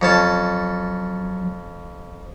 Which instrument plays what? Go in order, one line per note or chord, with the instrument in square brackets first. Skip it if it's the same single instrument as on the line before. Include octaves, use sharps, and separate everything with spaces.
[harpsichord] F2 C#4 A5 [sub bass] F#3